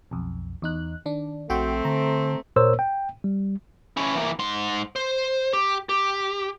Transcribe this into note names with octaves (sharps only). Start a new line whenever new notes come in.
B1 F2
E2 D#4 F#6
D#3 D4
A#1 A3 C4 F#4 G5
D3 A#5
A#2 A#4 C5 C#5 E6
G5
G3
C#4 E4
E3 A#3
G#2 C6
C5
G4
G4